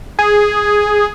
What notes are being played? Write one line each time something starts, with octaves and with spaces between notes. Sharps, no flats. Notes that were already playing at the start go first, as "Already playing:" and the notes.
G#4